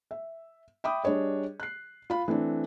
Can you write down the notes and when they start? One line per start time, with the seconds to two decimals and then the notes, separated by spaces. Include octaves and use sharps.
0.11 E5
0.84 E5 G5 B5 D6 D#6
1.04 G3 D4 G#4 C#5 D#5
1.60 F#6 C7
2.10 F4 B5
2.28 E3 A3 C4 D4